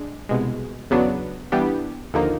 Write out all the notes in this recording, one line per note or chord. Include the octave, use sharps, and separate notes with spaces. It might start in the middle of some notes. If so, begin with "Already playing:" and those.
Already playing: G#3 D4
C2 B2 G#3
E2 C#3 F#3 B3 D4
E3 G3 B3 D4 G4
D#2 D3 F3 A#3 D#4